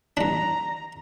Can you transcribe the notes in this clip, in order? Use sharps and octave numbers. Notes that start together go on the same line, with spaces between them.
G2 D4 A#5